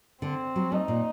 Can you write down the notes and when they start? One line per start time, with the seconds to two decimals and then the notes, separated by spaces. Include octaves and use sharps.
0.22 D3 C4
0.56 F#3
0.72 A3 D#4
0.88 A#2